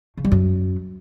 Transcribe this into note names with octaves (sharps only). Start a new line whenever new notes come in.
C#3
G3
F#2